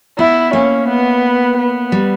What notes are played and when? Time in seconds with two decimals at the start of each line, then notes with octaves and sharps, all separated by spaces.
0.18 B3 E4
0.53 A#3 C#4
0.89 B3
1.58 B3
1.92 G3